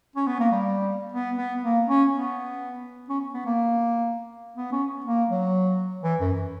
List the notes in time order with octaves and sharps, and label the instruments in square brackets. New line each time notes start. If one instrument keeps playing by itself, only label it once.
[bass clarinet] C#4
B3
A#3
G3
B3
B3
A#3
C#4
B3
C#4
B3
A#3
B3
C#4
A#3
F#3
E3
F#2